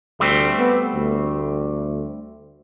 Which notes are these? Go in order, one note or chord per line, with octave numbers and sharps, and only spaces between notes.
D2 G3 A3 C4
B3
D2